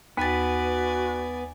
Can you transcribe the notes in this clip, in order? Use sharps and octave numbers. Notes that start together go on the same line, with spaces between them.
D#2 B3 F#4 B4 D5 G#5 A6